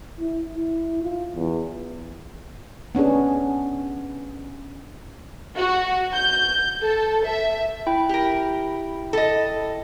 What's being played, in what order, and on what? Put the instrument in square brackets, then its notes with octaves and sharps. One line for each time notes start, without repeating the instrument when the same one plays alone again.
[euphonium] E4
E4
F4
E2
[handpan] B3 C#4 D4 G#4
[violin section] F#4
G6
A4
E5
[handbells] E4 G5 B5
[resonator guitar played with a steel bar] G4 A#4
A4 D#5